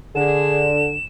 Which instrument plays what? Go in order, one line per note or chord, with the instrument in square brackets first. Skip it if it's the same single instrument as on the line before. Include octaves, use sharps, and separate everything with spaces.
[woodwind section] D3 [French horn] G#4 [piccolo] E7